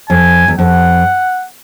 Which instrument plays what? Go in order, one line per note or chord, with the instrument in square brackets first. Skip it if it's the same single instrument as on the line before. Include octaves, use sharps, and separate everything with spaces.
[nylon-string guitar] F2 [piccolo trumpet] G#5
[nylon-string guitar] E2
[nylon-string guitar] F2 [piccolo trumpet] F#5